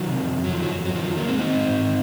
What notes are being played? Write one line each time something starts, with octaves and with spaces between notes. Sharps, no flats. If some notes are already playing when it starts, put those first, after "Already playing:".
Already playing: D#3 F#3
C3
F2
F2
F#3
D#3 F3
F2 F#3
F2 F#3
D#3 F3
F#3
D#3
F#3 A#3
F2 G#3 C4
D#3 C4 D#4
G#2
G#2
D#3